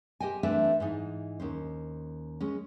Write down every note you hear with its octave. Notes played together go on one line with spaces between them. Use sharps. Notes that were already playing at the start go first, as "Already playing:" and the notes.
G4 C5 D#5 G5 G#5
E3 A3 C4 D4 B4 E5
G#2 E3 D#4
D#2 C#4 C5
G#3 C#4